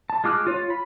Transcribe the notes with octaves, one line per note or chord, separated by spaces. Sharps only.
A5
G#3 F4 D6 F6 F#6
F4 C#5
B5